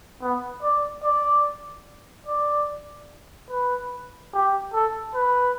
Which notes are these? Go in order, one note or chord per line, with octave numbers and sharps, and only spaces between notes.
B3
D5
D5
D5
B4
G4
A4
B4